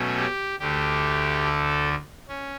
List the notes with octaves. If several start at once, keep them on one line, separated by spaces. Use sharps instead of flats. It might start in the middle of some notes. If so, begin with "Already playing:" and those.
Already playing: B2 F#3 A3 C#4
G4
D2 D3 A3 G4
A4
C#4